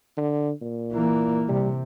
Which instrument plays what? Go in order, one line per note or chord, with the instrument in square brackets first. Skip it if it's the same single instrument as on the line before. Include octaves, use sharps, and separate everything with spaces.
[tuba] D3
A#2
[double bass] E3 A#3
[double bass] C3 [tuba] G3